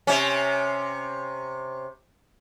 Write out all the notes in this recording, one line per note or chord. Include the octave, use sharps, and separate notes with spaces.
C3 C#4